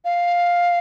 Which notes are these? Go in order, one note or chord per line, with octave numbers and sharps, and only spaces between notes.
F5